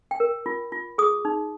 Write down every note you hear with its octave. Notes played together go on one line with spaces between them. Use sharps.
G5
A#4
F4
F4
G#4 D#6
D#4